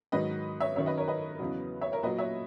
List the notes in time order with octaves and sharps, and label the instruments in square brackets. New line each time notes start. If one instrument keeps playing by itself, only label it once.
[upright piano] G#2 D#3 F#3 B4 D#5
C#5 E5
F#2 D#3 F#3 C#5 E5
B4 D#5
A#4 C#5
B4 D#5
E2 C#3 F#3
C#5 E5
A#4 C#5
A#2 F#3 B4 D#5
C#5 E5